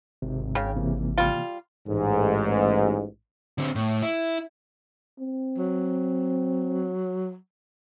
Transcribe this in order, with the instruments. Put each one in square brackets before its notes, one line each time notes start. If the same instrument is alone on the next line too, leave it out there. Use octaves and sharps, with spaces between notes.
[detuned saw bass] G#1 [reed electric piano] C3
[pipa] C#3 [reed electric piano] C#5 G5
[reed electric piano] C3 E3 A#3
[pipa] G3 F4
[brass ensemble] A1 G#2
[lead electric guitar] D3 C4
A2
E4
[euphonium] C4
[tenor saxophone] F#3